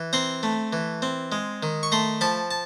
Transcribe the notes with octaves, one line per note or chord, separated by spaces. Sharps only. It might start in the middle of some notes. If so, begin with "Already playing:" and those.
Already playing: E3
C4 A#5 C6
A3
E3
C4
G#3
D#3
C#6
A3 A#5 C6
F3 A5 B5
A5